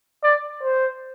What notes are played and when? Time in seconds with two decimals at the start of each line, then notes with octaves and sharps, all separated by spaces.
0.23 D5
0.63 C5